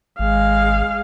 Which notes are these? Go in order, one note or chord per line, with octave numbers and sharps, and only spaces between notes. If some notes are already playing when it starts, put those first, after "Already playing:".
G#1 G#3 F5